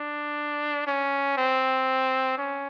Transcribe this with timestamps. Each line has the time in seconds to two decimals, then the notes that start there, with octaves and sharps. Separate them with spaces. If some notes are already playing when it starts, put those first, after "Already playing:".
Already playing: D4
0.87 C#4
1.37 C4
2.38 C#4